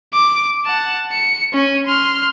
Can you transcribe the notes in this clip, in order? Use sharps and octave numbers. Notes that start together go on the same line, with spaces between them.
D6
F#5 A5
C#7
C#4 G#5
C6 F6